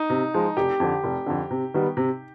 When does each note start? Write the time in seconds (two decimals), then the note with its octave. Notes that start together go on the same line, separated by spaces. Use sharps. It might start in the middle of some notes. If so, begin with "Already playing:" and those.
Already playing: D#4
0.10 C3
0.34 F3 G#3
0.57 F1 G4
0.80 F2 D3
1.04 F1
1.26 F2 D3
1.51 C3
1.74 D#3 G3 B3
1.97 C3